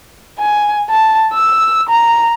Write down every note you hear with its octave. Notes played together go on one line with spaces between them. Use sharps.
G#5
A5
E6
A#5